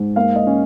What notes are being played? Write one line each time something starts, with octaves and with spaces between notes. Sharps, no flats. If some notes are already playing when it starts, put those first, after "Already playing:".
Already playing: G#2
A#3 F5
D#5
C#4